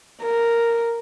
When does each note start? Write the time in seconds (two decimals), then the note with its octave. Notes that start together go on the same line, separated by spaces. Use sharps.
0.22 A#4